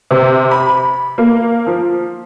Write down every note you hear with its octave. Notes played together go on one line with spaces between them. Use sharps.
C3
B5
A#3
F3